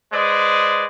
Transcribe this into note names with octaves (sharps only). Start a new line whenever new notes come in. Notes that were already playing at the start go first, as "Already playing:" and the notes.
G#3 B4 C5 D5 D#6